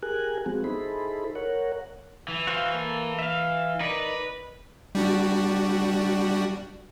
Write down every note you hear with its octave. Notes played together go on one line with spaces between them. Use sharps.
G4 G#4 A#4 G#5 F#6
F3 G#3 B3 C4 F#4 G#4
D#4 E4 G#4 A4 C5 B5
A#4 C#5 F#5
E3
F#4 C5 F5
A#3 A4
E5 F5
D#4 A#4 B4 D5
G3 D4 F#4